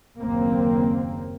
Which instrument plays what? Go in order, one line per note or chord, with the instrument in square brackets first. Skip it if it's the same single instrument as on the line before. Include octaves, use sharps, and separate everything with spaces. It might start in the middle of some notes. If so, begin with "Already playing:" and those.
[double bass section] F#1 D#2 A#3 C4